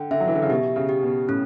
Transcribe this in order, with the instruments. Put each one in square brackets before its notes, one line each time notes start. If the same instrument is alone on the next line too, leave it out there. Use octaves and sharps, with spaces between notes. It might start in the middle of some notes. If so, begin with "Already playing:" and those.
Already playing: [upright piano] D3 [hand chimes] G5
[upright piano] D3 [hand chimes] E5
[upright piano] F#3
E3
D3
C#3
[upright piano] B2 [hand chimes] G4
[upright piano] C#3
[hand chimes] G4
[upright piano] B2
[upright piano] A2 [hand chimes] C#4